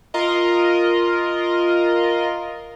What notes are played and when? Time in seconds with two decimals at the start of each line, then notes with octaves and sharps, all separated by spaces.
0.14 F4 A#4 D#5